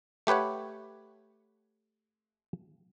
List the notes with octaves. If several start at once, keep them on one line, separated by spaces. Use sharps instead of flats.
A3 G4 B4 C#5 F#5